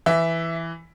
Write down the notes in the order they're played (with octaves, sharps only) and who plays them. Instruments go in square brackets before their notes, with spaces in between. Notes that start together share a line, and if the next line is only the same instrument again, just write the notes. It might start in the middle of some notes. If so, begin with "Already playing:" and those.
[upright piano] E3 E5